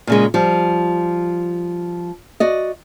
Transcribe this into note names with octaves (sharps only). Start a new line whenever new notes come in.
A#2 C#3 G#3
F3 G3
F#4 D5 D#5